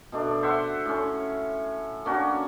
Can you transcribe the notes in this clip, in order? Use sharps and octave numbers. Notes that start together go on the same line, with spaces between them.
B2 A3 D4
C5 E5 F#5 C6
A2 C#4
A#3 C#4 D4 F#4